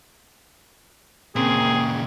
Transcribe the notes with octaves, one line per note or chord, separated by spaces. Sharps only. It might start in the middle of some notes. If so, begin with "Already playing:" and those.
A#2 C#3 A#3 C4 G#4